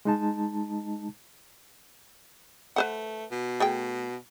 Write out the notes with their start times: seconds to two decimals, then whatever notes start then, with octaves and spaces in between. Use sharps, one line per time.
0.05 G#3 D#4 A5
2.76 A3 B4 C5 F#5
3.31 B2
3.60 A3 G#4 G5